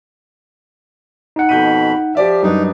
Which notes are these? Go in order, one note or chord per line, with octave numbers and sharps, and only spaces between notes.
D#4 F#5
F2 B2 B5 G6 D#7
F3 G4 D5 E5
F#2 G3 D4 D#4 B4